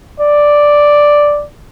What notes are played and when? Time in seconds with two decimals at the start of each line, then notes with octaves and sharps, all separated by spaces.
0.20 D5